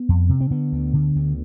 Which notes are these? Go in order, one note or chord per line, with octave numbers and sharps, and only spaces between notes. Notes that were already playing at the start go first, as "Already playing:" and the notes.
Already playing: B3
F2
C3
C4
D3 B3
D2
D3
D2